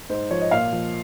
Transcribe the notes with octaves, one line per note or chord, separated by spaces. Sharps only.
G#2 C5
F3 C#5
D#5
A#2 F5
F3